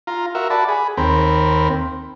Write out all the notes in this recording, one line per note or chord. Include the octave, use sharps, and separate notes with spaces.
F4 A#5
F#4 A#4 E5
F#4 D5 A5 B5
G#4 B5
D#2 C4 A#4 B5